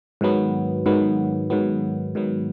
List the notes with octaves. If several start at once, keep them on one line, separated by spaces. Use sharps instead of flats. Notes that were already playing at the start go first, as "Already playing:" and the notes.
G#2 D#3 F#3 B3
G#2 D#3 F#3 B3
G#2 D#3 F#3 B3
G#2 D#3 F#3 B3